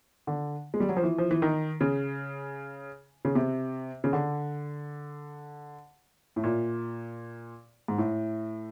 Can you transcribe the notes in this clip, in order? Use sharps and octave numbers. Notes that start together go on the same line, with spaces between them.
D3
G#3
G3
F#3
F3
E3
F3
E3
D#3
C#3
C#3
C3
C#3
D3
A2
A#2
G#2
A2